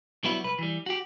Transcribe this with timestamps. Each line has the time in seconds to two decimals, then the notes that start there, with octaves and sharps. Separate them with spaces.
0.24 F#3 G3 B3 E4
0.44 C2 B4
0.58 E3 G3
0.86 F#4 G4